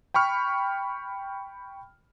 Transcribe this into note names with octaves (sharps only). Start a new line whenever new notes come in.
G5 B5 C#6 F6